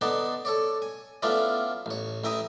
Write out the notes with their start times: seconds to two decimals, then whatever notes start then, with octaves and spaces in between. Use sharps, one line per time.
0.01 D3 B3 D#4 D5 F#5 A5
0.45 A4 C#5 D5
0.82 G#5
1.22 A3 B3 C#4 E4 F4 D5
1.86 A1 C#5
2.24 A1 E4 G5 A#5 D#6